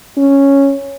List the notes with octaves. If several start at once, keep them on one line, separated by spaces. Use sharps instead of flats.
C#4